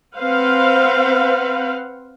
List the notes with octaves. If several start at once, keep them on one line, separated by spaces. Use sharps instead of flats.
C4 B4 C5 F5 F#5